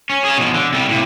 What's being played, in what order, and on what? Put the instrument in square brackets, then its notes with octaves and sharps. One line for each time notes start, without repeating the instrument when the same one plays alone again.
[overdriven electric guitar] C#4
G#4 C#5
B2 F3
D3
C3 G3
A2 C3